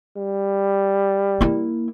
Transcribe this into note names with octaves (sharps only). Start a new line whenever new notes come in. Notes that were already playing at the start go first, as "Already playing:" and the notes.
G3
A#3 E4